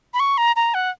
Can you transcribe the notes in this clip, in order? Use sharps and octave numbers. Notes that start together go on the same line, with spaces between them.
B5
C#6
A#5
A#5
F#5